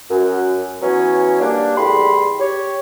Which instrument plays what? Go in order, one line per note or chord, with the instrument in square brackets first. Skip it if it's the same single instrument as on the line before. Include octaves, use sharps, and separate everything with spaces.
[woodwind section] F#2
E3 F#3 B3 C#4
G3 A#3 D4
E2 A2 G3 B5 C6
G4 C#5